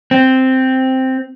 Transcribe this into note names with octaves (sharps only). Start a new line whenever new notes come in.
C4